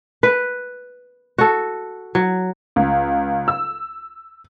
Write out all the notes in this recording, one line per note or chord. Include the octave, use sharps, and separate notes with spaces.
B4
F#4 A4
F#3
C#2
E6